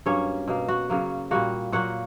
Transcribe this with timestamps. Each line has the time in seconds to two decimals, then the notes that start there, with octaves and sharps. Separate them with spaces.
0.06 G2 F#3 A#3 C#4 C#5
0.48 B2 A#3
0.68 F#4 F#5
0.90 C#3 F#3 A#3
1.31 A#2 G3 A#3 F#4 F#5
1.72 A#2 F#3 A#3 F#4 F#5